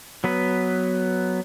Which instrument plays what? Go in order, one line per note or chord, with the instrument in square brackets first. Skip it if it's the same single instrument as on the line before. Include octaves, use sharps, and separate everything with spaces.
[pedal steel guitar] F#3 B3 B4